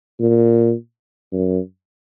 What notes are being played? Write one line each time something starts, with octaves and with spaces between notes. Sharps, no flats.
A#2
F#2